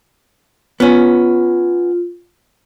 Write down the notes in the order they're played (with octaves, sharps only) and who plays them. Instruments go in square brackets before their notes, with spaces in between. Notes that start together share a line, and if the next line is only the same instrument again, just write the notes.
[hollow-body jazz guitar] B3 C#4 [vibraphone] F4